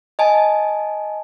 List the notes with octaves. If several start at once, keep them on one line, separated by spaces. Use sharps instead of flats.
D#5 G#5 A5